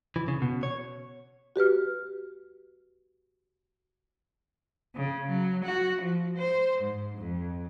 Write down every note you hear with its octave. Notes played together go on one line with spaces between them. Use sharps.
E3
C#3
B2
C#5
F#4 G4 B4 F6
C#3
F#3
F#4
F3
C5
G#2
F2